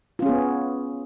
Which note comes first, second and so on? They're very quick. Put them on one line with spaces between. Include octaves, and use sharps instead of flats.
F4 C#4 G#4 B3